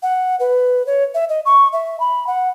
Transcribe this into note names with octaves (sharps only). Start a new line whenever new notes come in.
F#5
B4
C#5
E5
D#5
C#6
E5
B5
F#5